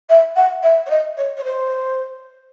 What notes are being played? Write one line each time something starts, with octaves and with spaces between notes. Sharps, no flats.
E5
F#5
E5
C#5
D#5
C#5
C#5
C5